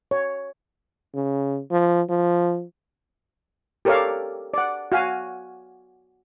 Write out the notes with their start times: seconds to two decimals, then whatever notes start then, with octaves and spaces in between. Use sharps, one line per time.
0.11 C#5
1.15 C#3
1.71 F3
2.09 F3
3.85 G4 A4 A#4 C#5 D5 F5
4.54 D5 F#5
4.92 F#4 F5 G#5